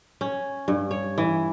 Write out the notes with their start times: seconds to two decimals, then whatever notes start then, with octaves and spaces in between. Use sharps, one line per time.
0.21 C#4
0.68 G2
0.91 C#5
1.18 E3